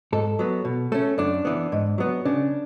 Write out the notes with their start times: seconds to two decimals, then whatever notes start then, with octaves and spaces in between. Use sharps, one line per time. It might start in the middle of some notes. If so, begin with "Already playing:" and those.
0.12 G#2 A4
0.39 F#3 B3
0.65 B2
0.92 A3 C#4
1.18 F#2 D4
1.45 E3 B3
1.72 G#2
1.98 F#3 B3
2.25 C#3 D4